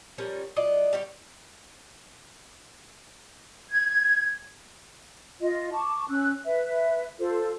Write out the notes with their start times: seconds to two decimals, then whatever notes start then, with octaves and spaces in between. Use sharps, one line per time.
0.18 F3 G3 C#4 A#4
0.56 F#3 F4 D5 D#5
0.93 G3 G4 C#5
3.70 G#6
5.41 F4 D#5
5.73 A5 C#6 D6
6.08 C#4 E6 F#6
6.45 B4 E5
7.19 F4 A4 C5